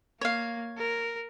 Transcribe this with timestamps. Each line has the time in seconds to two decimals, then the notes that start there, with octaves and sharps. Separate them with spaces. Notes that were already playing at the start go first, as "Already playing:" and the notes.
0.21 A#3 C#5 F5
0.78 A#4